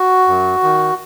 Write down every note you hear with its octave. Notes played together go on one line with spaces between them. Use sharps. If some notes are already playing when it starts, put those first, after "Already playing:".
Already playing: F#4
F#2
D#3